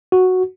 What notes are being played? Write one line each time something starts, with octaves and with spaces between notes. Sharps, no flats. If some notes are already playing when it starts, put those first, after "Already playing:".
F#4